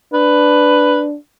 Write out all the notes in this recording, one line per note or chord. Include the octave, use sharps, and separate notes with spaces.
D4 B4